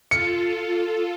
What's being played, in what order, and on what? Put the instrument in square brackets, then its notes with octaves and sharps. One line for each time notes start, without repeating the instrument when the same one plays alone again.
[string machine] F4 A4 [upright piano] C#7